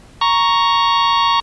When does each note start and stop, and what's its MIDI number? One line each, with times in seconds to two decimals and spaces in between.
0.21 1.40 82
0.21 1.40 85